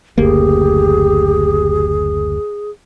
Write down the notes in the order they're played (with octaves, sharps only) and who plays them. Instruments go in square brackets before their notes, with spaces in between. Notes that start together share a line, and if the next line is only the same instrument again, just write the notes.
[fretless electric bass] F#1 D2 A#3 [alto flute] G4 [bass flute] G#4